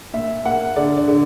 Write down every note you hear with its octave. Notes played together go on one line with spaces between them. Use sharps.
A#2 E5
A#3 F#5
D3 D5
D5
D3